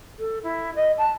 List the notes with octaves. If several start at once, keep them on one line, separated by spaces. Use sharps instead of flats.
A4
E4
D#5
A5